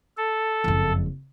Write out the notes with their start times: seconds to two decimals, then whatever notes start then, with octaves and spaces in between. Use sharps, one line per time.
0.17 A4
0.64 F#1 F2